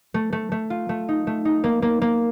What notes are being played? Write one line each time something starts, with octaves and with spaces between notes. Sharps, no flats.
A3
A3
A3
F4
A3
D#4
A3
D#4
A#3
A#3
A#3